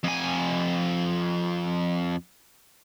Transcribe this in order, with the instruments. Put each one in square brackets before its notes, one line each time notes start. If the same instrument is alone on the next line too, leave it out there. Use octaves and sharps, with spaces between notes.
[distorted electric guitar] F2 G#5